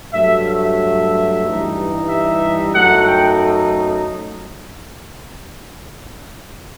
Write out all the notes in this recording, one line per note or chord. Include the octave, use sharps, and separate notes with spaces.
G2 F#3 A3 E5
E5
G2 E3 G3 D#4
E5
F#2 F#3 A3 D#4 F#5
G5